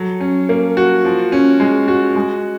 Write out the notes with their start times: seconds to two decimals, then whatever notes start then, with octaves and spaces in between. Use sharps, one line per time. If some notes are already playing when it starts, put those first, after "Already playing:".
Already playing: F#3 A4
0.20 C#4
0.49 A#3
0.77 F#4
1.05 F3
1.32 C#4
1.60 G#3
1.88 F#4
2.16 G#3